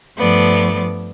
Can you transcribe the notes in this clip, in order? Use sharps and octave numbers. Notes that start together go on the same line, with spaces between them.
G2 F3 A3 B3 D5